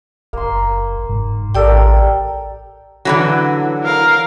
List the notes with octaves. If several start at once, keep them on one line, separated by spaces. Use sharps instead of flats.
F#1 A#3 C6
G#2
A1 G4 A4 A#4 D5 G5
D3 E3 F#3
A#4 F5